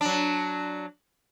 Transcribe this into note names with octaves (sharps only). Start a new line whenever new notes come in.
F#3 D4